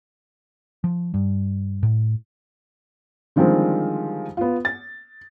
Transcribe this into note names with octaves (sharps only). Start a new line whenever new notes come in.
F3
G2
A2
D3 D#3 F3 G3 G#3 C4
B3 F4
A6